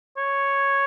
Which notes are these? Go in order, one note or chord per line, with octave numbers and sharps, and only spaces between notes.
C#5